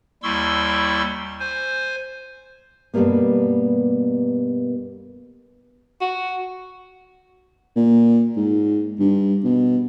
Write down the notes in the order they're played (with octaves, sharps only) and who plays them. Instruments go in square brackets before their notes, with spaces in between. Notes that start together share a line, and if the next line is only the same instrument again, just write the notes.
[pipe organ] D#2 G3 E4 C6 C#6 E6
C5 G#5
[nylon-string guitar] G2 B2 F#3 G3 A#3 B3
[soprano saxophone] F#4
[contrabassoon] A#2
G#2
G2
B2